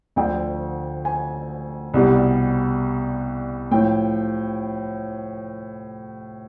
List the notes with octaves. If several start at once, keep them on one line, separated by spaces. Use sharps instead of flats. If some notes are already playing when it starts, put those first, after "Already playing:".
D2 D3 F3 G5
G#5
C2 B2 G3
A2 F3 G5